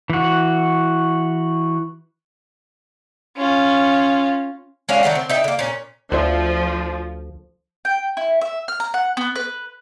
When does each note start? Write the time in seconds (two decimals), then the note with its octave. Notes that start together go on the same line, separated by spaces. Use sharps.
0.10 E3 F#4
3.36 C#4 F4
4.89 G#3 C#4 D4 F5
5.03 D#3 E3 F#3 A3
5.15 C4
5.29 D#4 E5 G5
5.44 D3 A#3
5.59 A#2 C#4
6.12 D2 F3 C5 D5 E5
7.85 G5
8.17 E4
8.41 E5
8.68 F6
8.80 A#5
8.94 F#5
9.17 B3
9.36 B4